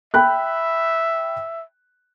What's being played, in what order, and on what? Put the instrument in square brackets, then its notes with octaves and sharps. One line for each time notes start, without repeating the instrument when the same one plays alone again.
[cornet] E5 [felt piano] G5 B5 F#6